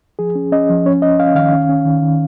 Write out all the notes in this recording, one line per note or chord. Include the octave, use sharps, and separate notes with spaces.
F3 G#4
C#4
C#4 D#5
F3
C#4 C#5
C#4 D#5
C#4 F5
D#3 F5
C#4
C#4
D#3
D#3